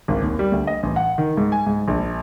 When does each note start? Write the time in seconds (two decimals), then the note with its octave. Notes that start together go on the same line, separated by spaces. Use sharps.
0.08 G#1
0.22 D#2
0.39 G3
0.52 D2
0.67 D#5
0.83 A1
0.96 F#5
1.18 D#3
1.37 G#2
1.52 G#5
1.66 G#2
1.88 A#1